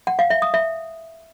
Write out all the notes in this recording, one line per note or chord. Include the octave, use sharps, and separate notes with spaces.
F#5
F5
E5
D#6
E5